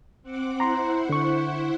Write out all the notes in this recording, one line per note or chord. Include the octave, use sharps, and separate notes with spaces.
C4 F#5 D6
E4 C5 F#5 A#5 C6
D3 C#6